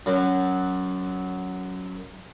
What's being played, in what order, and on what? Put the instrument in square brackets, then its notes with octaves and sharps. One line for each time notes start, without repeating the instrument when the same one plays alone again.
[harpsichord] F#2 F#3